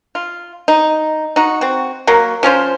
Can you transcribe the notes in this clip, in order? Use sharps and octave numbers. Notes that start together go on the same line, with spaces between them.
F4
D#4
D#4 F#4
C4 F#4
F#3 A#3
F3 C#4 F4 C5